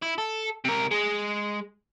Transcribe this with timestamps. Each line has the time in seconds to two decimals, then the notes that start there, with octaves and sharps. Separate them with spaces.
0.02 E4
0.18 A4
0.65 C3 A#4
0.91 G#3